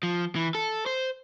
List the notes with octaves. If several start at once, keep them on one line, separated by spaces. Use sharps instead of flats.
F3
E3
A4
C5